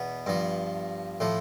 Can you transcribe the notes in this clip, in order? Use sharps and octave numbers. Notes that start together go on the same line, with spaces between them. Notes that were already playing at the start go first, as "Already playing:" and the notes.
Already playing: E2 B2 B3
G2 F3
A2 F3